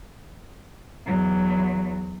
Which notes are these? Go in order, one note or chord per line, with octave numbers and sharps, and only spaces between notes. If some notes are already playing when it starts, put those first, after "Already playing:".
E2 F#3